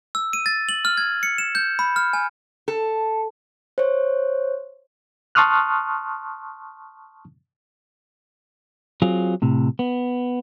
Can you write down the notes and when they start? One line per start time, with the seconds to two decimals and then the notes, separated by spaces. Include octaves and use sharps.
0.15 E6
0.33 D#7
0.46 A6
0.69 F#7
0.85 F6
0.97 G#6
1.23 C#7
1.38 E7
1.55 G6
1.79 B5
1.96 F6
2.13 G#5
2.68 A4
3.78 C5 C#5
5.35 A5 C6 C#6 D#6 F6 F#6
9.02 F#3 C4 F4 G#4
9.42 A2 C3
9.79 B3